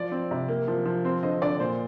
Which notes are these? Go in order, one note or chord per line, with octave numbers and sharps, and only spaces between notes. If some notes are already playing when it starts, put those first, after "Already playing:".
Already playing: F3 D5
C4
C3
A#3
F3
F3
C4 C5
D3 C5 D#5
D3 D5
A#2 C5